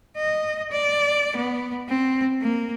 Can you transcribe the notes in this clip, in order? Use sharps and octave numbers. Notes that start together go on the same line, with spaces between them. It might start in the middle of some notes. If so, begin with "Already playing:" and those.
D#5
D5
B3
C4
A#3